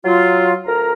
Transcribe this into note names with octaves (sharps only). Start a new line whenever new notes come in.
F#3 F4
D2 A#4 A#5